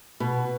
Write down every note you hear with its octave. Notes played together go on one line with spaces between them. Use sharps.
B2